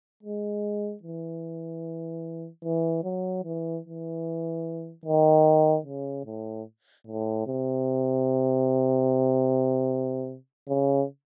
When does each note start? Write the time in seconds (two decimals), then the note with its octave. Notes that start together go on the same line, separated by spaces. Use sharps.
0.23 G#3
1.03 E3
2.64 E3
3.04 F#3
3.44 E3
3.85 E3
5.05 D#3
5.86 C#3
6.26 A2
7.07 A2
7.47 C3
10.68 C#3